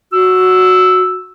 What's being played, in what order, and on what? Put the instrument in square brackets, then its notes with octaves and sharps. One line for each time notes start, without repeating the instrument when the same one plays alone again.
[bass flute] F#4 [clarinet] E6